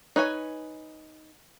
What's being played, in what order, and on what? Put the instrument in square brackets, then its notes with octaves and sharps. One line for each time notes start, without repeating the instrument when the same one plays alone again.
[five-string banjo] D#4 B4 C#5 G#5